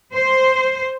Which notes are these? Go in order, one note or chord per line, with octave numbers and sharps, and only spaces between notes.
C5